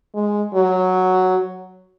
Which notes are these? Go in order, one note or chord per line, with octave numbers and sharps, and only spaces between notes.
G#3
F#3